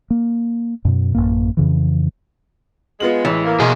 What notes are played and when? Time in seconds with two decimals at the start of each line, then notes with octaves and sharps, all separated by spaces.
0.10 A#3
0.85 F#2 B2
1.15 A1 F#2 A#3
1.57 F2 C#3 E3
3.00 G#3 B3 F4 F#7
3.25 A1 E3
3.45 A#3
3.60 B2 G#4 D#5 G#5 C6